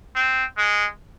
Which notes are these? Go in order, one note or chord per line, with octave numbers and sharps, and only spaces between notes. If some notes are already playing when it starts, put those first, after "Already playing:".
C4
G#3